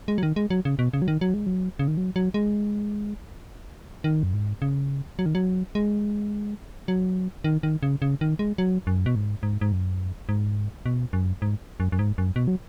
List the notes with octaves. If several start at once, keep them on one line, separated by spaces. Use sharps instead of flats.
G#3
F#3
D#3
G#3
F#3
C#3
B2
C#3
F#3
D#3
F#3
G#3
F#3
C#3
D#3
F#3
F#3
G#3
D#3
F#2
G#2
C#3
F#3
D#3
F#3
G#3
F#3
D#3
D#3
C#3
C#3
D#3
G#3
F#3
F#2
B2
G#2
G#2
G#2
F#2
G#2
B2
F#2
G#2
F#2
F#2
G#2
F#2
B2
F#3